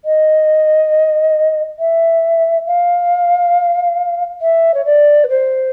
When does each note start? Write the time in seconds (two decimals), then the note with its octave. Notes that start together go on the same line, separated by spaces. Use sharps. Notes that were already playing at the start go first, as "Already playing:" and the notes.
0.05 D#5
1.79 E5
2.67 F5
4.41 E5
4.74 C#5
4.85 D5
5.24 B4
5.29 C5